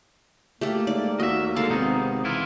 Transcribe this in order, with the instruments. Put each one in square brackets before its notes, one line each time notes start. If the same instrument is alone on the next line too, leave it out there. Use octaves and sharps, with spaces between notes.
[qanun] A3 G4 A4 [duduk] A#3
[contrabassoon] G#2 [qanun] D5
[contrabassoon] D#2 [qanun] F#4 [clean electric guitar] D#5 E5
[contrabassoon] G#2 [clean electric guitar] D3 [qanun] A4 F5 A#5
[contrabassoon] G#1 [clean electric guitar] C3 D#4 [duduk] B3
[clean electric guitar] E3 E4 F4